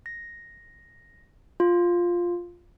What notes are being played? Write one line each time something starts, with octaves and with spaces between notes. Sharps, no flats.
A#6
F4